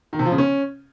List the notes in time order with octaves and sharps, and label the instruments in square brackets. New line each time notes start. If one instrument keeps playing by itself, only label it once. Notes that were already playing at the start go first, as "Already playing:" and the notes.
[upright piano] D#3
C3
F3
C#3
C#4